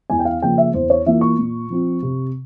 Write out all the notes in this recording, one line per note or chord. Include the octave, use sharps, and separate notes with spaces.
E2 G#5
G5
F5
C#3 F3 A#3 G5
E5
E2 C5
C#5
E3 A#3 F4 E5
C#6
A#2
F3 C4 F4
C3